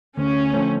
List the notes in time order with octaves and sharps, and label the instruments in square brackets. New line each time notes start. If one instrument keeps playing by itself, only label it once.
[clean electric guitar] D2 [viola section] C#4
[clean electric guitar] D3 F3 A3 C4